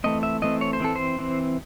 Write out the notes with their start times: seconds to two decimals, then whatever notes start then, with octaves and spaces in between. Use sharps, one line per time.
0.04 E3 A3 C4 D#5
0.23 E5
0.42 E3 A3 C4 D#5
0.61 C#5
0.73 C5
0.80 E3 C4 A4
0.96 C5
1.19 E3 C4